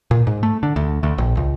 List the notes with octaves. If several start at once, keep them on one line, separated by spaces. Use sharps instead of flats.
A#2
G#2
A3
D3
D2
D2
A#1
C#2